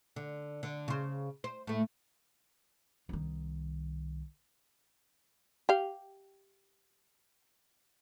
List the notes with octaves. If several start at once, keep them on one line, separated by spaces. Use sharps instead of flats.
D3
D3
C#3 C5
C5
A2 A3
C2 D#3
G4 F5